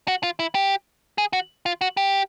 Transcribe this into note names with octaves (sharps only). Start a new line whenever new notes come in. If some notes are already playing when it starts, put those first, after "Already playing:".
F#4
F4
E4
G4
G#4
F#4
F4
F#4
G4